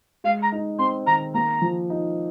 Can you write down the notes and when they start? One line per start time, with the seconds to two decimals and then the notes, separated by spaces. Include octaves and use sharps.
0.24 G#3 F5
0.42 A#5
0.52 D#4
0.79 C4 C6
1.07 D#3 A#5
1.34 A#3 A#5
1.62 F3
1.90 D#4